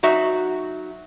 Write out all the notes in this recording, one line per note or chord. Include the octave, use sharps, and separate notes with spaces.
F#3 D#4 F#4 E5